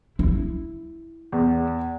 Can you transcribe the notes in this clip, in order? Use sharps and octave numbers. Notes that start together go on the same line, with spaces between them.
E4
E2